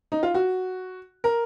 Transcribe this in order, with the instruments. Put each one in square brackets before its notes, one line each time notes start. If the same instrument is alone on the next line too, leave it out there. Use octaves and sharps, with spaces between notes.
[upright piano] D#4
F4
F#4
A#4